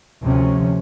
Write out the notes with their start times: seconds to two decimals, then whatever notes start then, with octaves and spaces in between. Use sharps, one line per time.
0.22 D2 C3 F3 C#4